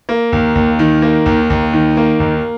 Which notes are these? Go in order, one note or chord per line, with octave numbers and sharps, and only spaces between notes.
A#3
D#2
D#2
D#3
A#3
D#2
D#2
D#3
A#3
D#2